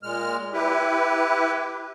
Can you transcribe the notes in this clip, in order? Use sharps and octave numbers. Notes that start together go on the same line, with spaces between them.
A#2 G#3 F6
E4 G4 B4